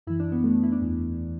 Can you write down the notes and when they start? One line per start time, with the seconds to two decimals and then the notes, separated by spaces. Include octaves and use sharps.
0.07 F#2 E3 E4
0.20 D4
0.32 B3
0.44 A3
0.54 A3
0.63 E4
0.72 D4
0.81 E2 E3